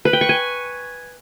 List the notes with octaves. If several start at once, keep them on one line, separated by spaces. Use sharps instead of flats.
B4
G5
C#6
G#5